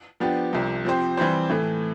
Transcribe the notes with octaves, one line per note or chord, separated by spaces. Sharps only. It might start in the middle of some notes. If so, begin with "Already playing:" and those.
F3 B3 D4 G4
C2 C3 F3
F3 C4 G4 C5
E3 G3 C4 G4 C5
A2 E3 A3